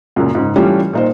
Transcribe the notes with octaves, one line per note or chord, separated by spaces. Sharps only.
C#2 F#2 A#2
C#2 G#2
E3 G3 A3 C#4 D4 F4
A#2 D#4 C5